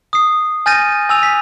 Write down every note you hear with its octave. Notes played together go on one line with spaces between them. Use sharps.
D#6 C7
G#5 F6 G6 A6 A#6 D#7
G#5 E6 F7
B6